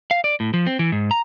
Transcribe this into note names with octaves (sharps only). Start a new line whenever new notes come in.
F5
D5
A2
F3
C4
E3
G#2
A#5